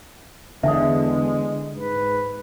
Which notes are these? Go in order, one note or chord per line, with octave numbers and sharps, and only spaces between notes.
E2 D3 G#3 E5 G#5 D#6
G#2 B4